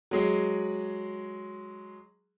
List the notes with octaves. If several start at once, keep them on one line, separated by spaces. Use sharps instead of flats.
F#3 G#3 G#4